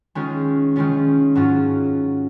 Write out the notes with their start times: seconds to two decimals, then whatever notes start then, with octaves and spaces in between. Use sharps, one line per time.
0.15 D#3 G#3 C#4 F4
0.76 D#3 G#3 C#4 F4
1.35 G#2 F#3 C#4 F4